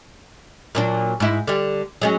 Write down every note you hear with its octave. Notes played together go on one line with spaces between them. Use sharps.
A#2 F#3 D4
G#2 E4
D3 G3
F#3 G#3 C#4